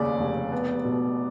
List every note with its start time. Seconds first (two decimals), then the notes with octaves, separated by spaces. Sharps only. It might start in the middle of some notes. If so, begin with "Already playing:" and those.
Already playing: F1 D#2 C#3 D5
0.20 F1
0.52 B3
0.85 B2